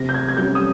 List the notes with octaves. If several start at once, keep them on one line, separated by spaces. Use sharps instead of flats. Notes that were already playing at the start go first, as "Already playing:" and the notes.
Already playing: C3 A#6
G6
G#6
G#6
G3 C#4 G6
D#6